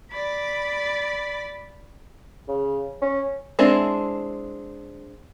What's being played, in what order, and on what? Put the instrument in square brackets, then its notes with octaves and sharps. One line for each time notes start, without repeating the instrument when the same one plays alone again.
[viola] D5 B5
[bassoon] C#3
C#4
[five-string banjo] G#3 C4 D4 E4